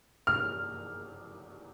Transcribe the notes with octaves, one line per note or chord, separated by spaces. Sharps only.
F6